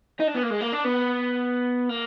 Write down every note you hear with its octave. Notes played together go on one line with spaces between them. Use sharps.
D#4
D4
B3
A#3
G#3
A#3
D4
B3
A#3